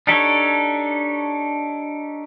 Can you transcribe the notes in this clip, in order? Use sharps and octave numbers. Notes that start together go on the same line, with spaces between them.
D4 D#4 G4 A4 C#5